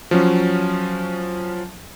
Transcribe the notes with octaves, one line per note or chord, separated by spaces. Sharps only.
F3 F#3 C#4